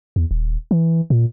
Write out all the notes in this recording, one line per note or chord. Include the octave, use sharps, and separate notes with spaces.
E2
D#1
E3
A#2